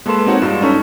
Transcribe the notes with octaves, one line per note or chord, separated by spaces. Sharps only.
G#3 A#3 A4 B4 C6 E7
C4 D#4 F#4 C#5 F#5
G2 G#3 F4 E7
C#4 D#4 A4 C#6 B6